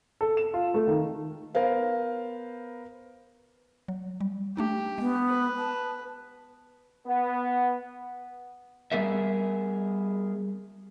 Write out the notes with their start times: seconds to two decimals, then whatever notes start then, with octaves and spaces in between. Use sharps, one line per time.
0.21 A4
0.37 E7
0.54 F4
0.74 A3
0.88 D#3
1.55 B3 A#4 C5 F5
3.88 F#3
4.21 G3
4.57 A3 D4 D#4 G4
4.98 G#3 B3
5.29 B4
5.57 A5
7.06 B3
8.92 G3 B3 G#4 A#4 E5